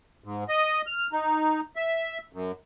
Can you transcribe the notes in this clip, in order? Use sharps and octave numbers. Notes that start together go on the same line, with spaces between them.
G#2
D#5
F6
D#4
E5
F#2